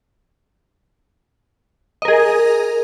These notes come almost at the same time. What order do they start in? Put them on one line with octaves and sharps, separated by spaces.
D#5 A#4 G#4